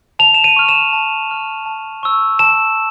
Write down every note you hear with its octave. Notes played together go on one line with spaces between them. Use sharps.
A5 F7
E7
D#7
C#6 F6
E7
A5
C#6 F6
A5
C#6 E6
A5 E7